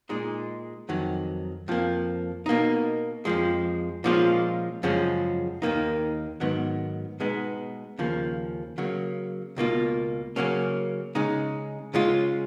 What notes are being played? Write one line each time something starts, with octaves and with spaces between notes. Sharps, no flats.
A#2 G#3 D#4
F2 D#3 F#3
F2 F3 A#3
B2 A#3 D#4
F2 F3 G#3
A#2 F3 G#3 C#4 F4
F#2 C#3 F3 G#3 C#4
D#2 D#3 A#3 D#4
G#2 D#3 F#3 B3
B2 G#3 B3 D#4
D#2 C#3 F3 A#3
C#3 F#3 A#3
C#2 B2 A#3 F4
C#3 F#3 A#3 C#4
C#3 G#3 D#4
C#3 G#3 C#4 F4